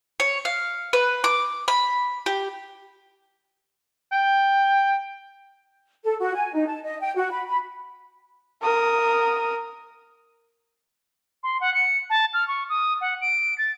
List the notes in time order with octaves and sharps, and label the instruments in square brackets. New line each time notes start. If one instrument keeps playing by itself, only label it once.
[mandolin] C#5
F5
B4
D6
B5
G4
[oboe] G5
[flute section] A4
F#4
G#5
D#4
A5
D#5
G5
F#4
B5
B5
[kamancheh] A#4 D#6
[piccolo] C6
F#5
C#7
A5
F6
C#6
D#6
F#5
D7
A6